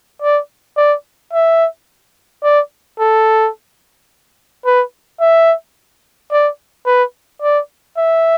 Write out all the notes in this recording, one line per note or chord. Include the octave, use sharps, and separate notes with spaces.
D5
D5
E5
D5
A4
B4
E5
D5
B4
D5
E5